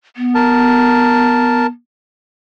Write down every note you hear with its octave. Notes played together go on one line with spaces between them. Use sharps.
B3
A#4 A5